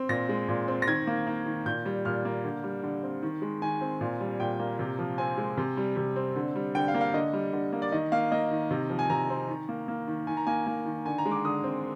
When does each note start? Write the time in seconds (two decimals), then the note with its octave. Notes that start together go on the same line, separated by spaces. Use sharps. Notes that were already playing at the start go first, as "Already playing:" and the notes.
Already playing: C4
0.09 A#2 A#6
0.29 G#3
0.48 A#2
0.68 C4
0.82 A#6
0.87 D#3 G#6
1.07 A#3
1.27 A#3
1.46 D#3
1.66 A#2 G6
1.86 G3
2.05 A#2 F6
2.25 A#3
2.44 D3
2.64 G3
2.83 D3
3.03 C4
3.22 D#3
3.42 G#3
3.62 D#3 G#5
3.81 C4
4.01 A#2
4.21 G3
4.40 A#2 G5
4.60 A#3
4.79 C3
4.99 F3
5.18 C4 G#5
5.37 G#3
5.57 C3
5.77 G3
5.97 C3
6.16 C4
6.36 D3
6.55 G3
6.75 D3 G5
6.88 F5
6.94 A#3
7.01 F5
7.14 D3 D#5
7.33 G3
7.53 D3
7.73 A#3
7.82 D5
7.92 D#3 D#5
8.12 A#3 F5
8.32 A#3 D#5
8.51 D#3
8.71 C3
8.90 F3
8.99 G#5
9.10 C3 A#5
9.30 C4
9.49 D#3
9.69 A#3
9.88 A#3
10.07 D#3
10.27 D#3 G#5
10.37 A#5
10.47 A#3 G#5
10.66 A#3
10.86 D#3
11.05 D3 G#5
11.18 A#5
11.26 G#3
11.31 D6
11.45 D3 D#6
11.64 C4